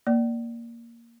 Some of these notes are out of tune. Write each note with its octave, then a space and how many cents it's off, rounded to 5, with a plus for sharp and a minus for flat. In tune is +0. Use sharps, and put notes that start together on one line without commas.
A#3 +0 D5 +0